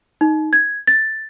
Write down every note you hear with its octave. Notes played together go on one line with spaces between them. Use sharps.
D#4
G#6
A6